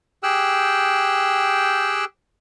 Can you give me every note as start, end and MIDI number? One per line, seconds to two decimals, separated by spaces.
0.23 2.05 67
0.23 2.05 68
0.23 2.05 79
0.23 2.05 88
0.23 2.05 90